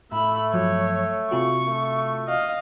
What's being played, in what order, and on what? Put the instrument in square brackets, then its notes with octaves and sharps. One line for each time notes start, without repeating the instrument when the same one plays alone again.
[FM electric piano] A2 [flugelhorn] A3 [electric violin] E5 B5
[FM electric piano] G2 F3 F#3 [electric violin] C#5
[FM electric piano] C3 F4 F#4 [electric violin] C#6
[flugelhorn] A3
[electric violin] D#5 F5